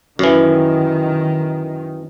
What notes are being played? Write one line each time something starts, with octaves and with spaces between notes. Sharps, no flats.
F#2 D#3 E3